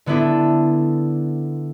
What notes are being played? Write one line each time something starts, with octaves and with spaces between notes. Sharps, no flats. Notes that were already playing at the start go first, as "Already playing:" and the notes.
D3 B3 D4 E4 A4